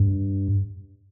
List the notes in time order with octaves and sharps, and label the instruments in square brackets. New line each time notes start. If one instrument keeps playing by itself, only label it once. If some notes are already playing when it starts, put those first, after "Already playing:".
Already playing: [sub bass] G2